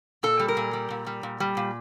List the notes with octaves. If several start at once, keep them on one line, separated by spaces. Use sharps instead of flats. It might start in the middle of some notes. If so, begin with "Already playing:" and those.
A#2 A4
G3
A#4
A#2
G3
A#2
G3
A#2
G3
A#2